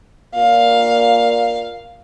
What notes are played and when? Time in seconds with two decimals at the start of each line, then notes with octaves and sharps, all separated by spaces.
0.35 A#2 F5